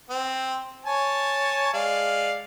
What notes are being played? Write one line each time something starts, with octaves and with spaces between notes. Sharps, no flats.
C4
C#5 G#5 A5
G#3 D5 F5